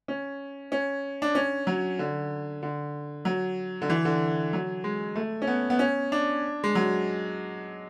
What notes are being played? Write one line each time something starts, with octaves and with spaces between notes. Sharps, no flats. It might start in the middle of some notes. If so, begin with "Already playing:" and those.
C#4
C#4
D4
C#4
F#3
D3
D3
F#3
D3
E3
D3
F#3
G#3
A3
C#4
B3
B3
C#4
D4
G#3
F#3